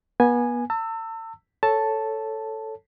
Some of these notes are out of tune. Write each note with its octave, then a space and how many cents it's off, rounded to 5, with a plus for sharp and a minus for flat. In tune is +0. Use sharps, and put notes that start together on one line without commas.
B3 -30 G#5 +0
A5 +45 E6 +0
A4 +0 C#5 +0 A5 +0